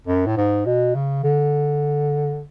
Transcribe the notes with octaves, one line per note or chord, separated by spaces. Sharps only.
F#2
A2
G#2
B2
C#3
D3